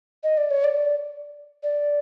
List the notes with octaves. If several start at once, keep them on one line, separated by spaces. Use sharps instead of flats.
D#5
D5
C#5
D5
D5